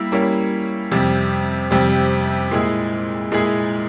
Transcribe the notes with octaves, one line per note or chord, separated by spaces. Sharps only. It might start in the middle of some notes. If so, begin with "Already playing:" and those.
Already playing: G3 A#3 E4
G3 A#3 C#4 E4
F2 C3 G3
F2 C3 G3
A#2 G#3 E4 G#4
A#2 G#3 E4 G#4